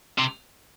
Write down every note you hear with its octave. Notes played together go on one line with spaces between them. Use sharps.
C3